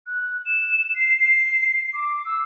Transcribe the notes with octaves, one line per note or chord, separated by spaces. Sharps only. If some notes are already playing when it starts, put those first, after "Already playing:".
F#6
E7
C7
C7
D6
E6